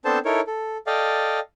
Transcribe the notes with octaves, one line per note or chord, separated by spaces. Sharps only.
B3 C4 D4 A4 C5 A5
D#4 E4 A4 A#4 C#5
A4
A4 D5 D#5 F5 G5